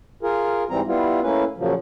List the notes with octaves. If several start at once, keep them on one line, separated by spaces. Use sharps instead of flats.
F4 G#4 A#4
G#2 E3 G3 C4 A#5
G3 B3 E4 F4
A3 A#3 C#4 E4 B4
A#2 C#3 F3 F#3